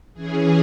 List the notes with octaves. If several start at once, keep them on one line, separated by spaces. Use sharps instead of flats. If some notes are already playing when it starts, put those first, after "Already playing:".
E3 C#4 G#4